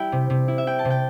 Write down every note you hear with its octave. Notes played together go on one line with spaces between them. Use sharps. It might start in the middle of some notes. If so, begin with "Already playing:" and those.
Already playing: G3 E4 E5 G5
C3
C3
E4
E5
E4 G5
A5
C3
G5